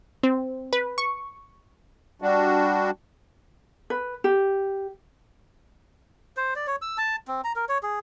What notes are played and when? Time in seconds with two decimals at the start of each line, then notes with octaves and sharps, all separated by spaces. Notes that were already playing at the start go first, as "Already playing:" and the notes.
0.23 C4
0.73 B4
0.98 C#6
2.22 G3 D4 F#4
3.90 B4
4.24 G4
6.37 C5
6.56 D5
6.67 C#5
6.82 E6
6.98 A5
7.28 C4
7.44 A#5
7.56 A#4
7.69 C#5
7.83 G#4